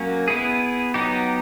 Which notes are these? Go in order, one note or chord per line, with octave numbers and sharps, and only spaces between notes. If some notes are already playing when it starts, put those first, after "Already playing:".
Already playing: F#3 A#3 C#4
B3 E4 G#4
F#3 B3 D#4 G4